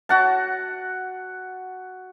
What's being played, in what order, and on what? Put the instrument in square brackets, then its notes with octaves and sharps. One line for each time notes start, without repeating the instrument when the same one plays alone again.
[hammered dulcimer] F#4 F#5 A5